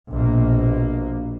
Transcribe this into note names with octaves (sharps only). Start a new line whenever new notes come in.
A#1 B2 A#3